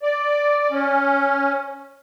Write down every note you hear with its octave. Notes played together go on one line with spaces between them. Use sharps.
D5
C#4